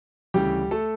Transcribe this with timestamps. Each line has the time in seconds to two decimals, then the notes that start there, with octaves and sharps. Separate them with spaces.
0.34 D2 C#3 E3 G3 G4
0.71 A3 A4